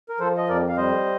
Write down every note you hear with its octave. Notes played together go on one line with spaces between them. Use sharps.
A#4
F3 A4 C5
D#5
F2 A#4 D5
F5
G3 C5 D#5